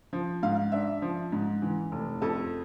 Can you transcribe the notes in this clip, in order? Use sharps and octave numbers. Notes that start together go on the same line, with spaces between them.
F3
G#2 F5
D4 E5
F3
G#2
E3
F1
F2 A4